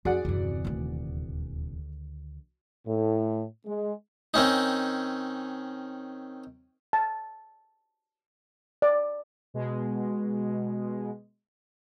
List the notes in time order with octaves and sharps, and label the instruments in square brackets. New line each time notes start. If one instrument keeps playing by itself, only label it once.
[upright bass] F2 [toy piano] F#4 [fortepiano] G#4 D5 F#5
[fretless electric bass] D#1 C3 E3 [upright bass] F#2 C4
[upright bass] D2 D#3
[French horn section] A2
G#3
[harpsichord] D#3 C4 C#4 D#4
[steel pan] A5
D5
[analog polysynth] B2 G#3